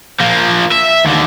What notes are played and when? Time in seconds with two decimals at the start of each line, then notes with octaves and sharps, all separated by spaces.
0.21 F3 A#3
0.72 E5
1.05 D#2 D3